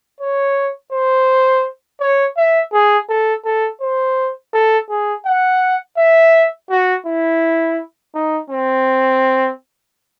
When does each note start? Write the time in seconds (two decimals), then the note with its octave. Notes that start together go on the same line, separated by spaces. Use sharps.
0.20 C#5
0.92 C5
2.01 C#5
2.37 E5
2.73 G#4
3.09 A4
3.45 A4
3.81 C5
4.53 A4
4.90 G#4
5.26 F#5
5.97 E5
6.70 F#4
7.06 E4
8.15 D#4
8.50 C4